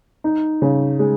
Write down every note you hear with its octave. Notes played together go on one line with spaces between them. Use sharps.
D#4
C#3
G#3